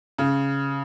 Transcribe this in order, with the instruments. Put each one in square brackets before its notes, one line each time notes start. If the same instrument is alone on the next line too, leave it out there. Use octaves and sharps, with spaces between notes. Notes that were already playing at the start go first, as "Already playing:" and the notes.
[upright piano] C#3